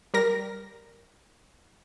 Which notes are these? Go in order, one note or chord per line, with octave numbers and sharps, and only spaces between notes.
G3 A#4 A#6